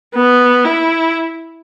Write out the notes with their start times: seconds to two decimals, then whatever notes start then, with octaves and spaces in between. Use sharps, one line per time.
0.15 B3
0.64 E4